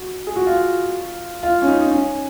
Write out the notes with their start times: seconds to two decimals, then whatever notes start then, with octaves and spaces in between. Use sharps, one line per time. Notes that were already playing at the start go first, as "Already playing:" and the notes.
Already playing: F#4
0.27 G#4
0.36 F#4
0.46 F4
1.43 F4
1.62 C#4
1.67 D#4
1.81 D#4
1.91 C#4